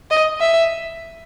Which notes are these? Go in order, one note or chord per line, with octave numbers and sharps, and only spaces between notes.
D#5
E5